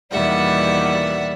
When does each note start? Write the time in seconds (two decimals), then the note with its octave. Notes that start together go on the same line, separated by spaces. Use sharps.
0.11 E2 B2 D#3 G3 A#3 D5 E5 F#5